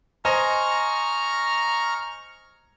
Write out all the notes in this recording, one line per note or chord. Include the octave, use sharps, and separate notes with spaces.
C5 D#5 G#5 A#5 C#6 F6